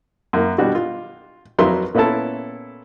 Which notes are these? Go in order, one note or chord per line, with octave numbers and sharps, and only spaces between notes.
F#2 A#3
B2 G3 D4 F#4
F4
F2 F#3 A#4 B4 E5 C6
A#2 B3 C#4 E4 A4 A5